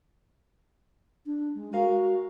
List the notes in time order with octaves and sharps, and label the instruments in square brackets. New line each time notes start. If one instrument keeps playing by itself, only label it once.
[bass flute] D4
G#3
[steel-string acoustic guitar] G#3 A#4 F5 [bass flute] F#4